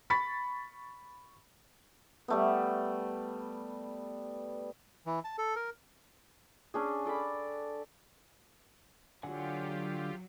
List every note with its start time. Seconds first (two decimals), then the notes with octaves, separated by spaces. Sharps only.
0.10 B5 C#6 A6 B6
2.28 G3 A3 B3
5.06 E3
5.24 A5
5.38 A4
5.56 A#4
6.74 C#4 D4 G#4
7.05 A4 D5 G5 B5
9.23 D3 F#3 F4 G4 F#5 G#5